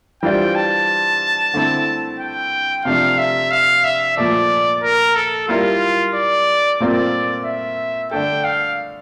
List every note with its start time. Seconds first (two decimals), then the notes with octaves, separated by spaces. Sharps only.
0.22 E3 G3 D4 F4 C5 G5
0.55 A5
1.54 D3 A3 C4 E4
2.20 G5
2.85 C3 F3 A3 D4 G4 F5
3.18 E5
3.51 F5
3.84 E5
4.17 A#2 F3 A3 D5
4.83 A#4
5.16 A4
5.48 G3 A#3 E4 F4 A#4
6.14 D5
6.80 A#2 A3 C4 F4 A#4 D5
7.45 E5
8.11 D3 A3 D4 A4 G5
8.44 F5